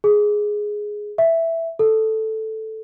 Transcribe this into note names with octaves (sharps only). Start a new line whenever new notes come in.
G#4
E5
A4